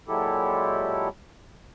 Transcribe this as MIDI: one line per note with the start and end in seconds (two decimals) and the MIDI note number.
0.08 1.08 46
0.08 1.08 54
0.08 1.08 56
0.08 1.08 64
0.08 1.08 67
0.08 1.08 69